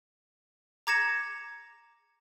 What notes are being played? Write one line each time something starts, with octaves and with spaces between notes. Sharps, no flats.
A#5 D6 G#6 A#6 C#7 E7